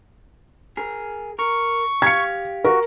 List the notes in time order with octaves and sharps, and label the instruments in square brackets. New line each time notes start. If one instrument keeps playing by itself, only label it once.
[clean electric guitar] G#4 A#4
[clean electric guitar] A#4 [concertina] C#6
[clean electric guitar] G4 F5 [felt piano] G#6 C#7
[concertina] F#4 [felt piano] A#4